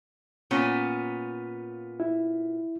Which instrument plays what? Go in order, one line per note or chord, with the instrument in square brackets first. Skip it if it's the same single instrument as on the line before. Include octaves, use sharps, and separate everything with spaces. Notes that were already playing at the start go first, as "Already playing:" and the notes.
[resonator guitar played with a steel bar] A#2 B3 C#4
[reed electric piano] E4